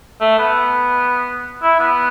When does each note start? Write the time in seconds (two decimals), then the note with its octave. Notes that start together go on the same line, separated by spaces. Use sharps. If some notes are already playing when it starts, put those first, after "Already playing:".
0.21 A3
0.39 B3
1.63 E4
1.80 B3